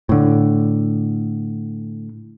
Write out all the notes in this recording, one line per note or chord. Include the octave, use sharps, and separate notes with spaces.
A2 D3